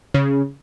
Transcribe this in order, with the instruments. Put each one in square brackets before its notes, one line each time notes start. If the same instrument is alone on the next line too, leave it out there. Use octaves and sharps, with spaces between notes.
[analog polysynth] C#3